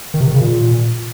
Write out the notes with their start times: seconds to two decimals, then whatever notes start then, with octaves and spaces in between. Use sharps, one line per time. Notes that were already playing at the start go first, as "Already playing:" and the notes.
0.14 D#3
0.21 C3
0.27 D#3
0.34 C#3
0.41 A#2